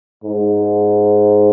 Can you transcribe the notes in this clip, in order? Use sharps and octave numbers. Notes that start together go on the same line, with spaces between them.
G#2